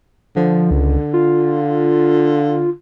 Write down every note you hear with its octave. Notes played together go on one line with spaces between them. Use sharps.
D3 F3
C#2
F4